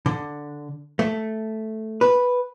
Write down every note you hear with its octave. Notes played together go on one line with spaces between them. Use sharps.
D3
A3
B4